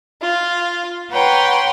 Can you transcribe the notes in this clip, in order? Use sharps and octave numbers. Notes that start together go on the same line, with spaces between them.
F4
B4 C#5 F#5 G5 A#5 C6